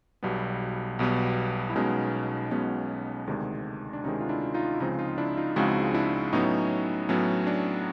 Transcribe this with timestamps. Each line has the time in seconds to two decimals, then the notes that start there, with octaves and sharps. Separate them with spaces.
0.23 B1 B2 G3 B3
0.99 B1 B2 G3 B3
1.69 E4
1.75 B1 B2 G#3 B3 C#4 D#4
2.51 B1 B2 G#3 B3 C#4
3.27 D2 C3 D#3 G#3 D4
3.93 D4
4.04 D2 C3 D#3 G#3 C#4 D#4
4.21 F4
4.29 D4 E4
4.54 D#4 F4
4.74 E4
4.80 C#2 C#3 F3 G#3 C4 D#4 F4
4.99 D#4 F4
5.18 D4 E4
5.37 D#4 F4
5.56 C#2 C#3 F3 G#3 C4 E4 F#4
5.94 D4 E4
6.33 A2 F#3 B3 C#4 D#4
7.09 A2 F#3 B3 C#4
7.47 D4